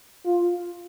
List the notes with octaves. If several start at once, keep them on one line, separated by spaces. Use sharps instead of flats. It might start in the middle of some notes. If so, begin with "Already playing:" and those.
F4